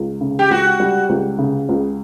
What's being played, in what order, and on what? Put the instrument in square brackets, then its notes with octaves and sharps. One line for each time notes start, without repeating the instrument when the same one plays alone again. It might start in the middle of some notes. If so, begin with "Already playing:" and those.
Already playing: [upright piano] C#2
C#3
[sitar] G4
[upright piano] C#2 [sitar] F#4
[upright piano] G3
C#2
C#3
C#2